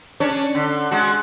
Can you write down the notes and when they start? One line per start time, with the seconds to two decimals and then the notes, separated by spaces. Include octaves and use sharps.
0.20 C#4 D4 C#5
0.55 D3
0.91 G#3 F#4